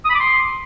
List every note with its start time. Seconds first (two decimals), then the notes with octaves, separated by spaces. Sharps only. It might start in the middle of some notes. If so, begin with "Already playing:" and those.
0.05 D#6
0.10 B5
0.15 D6
0.20 C6